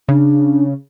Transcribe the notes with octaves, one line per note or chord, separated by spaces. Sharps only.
C#3 D4